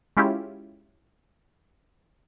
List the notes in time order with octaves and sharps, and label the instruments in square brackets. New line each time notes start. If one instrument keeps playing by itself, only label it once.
[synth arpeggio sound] G#3 C#4 E4 F4 G4